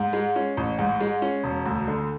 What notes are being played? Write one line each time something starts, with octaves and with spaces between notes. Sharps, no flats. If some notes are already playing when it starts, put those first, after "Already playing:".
Already playing: G#2
G#3
C#4
A1
G#2
G#3
C#4
E1
D2
D3